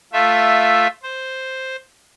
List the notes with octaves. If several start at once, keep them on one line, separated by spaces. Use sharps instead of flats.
A3 F4 E5
C5